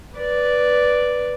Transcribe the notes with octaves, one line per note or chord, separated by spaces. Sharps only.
B4 D5